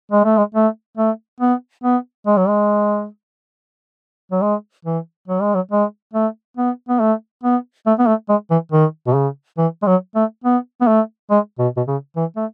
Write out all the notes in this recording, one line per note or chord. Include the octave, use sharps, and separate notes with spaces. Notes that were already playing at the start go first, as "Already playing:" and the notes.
G#3
A3
G#3
A3
A3
B3
B3
G#3
F#3
G#3
F#3
G#3
E3
F#3
G#3
F#3
G#3
A3
B3
B3
A3
B3
A3
B3
A3
G#3
E3
D#3
B2
C#3
E3
G#3
F#3
A3
B3
B3
A3
G#3
B2
B2
C#3
E3
A3